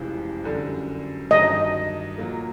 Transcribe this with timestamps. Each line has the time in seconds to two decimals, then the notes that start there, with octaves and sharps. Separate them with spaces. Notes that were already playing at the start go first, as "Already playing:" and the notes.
Already playing: F1 F2 C#3 E3 G#3
0.44 F#2 D3 G3
1.31 G2 D#3 F#3 D#5
2.18 A#2 F#3 A#3